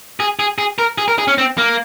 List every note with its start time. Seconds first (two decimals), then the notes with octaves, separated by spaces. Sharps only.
0.20 G#4
0.39 G#4
0.58 G#4
0.79 A#4
0.98 G#4
1.08 A#4
1.18 G#4
1.28 C#4
1.38 C4
1.58 A#3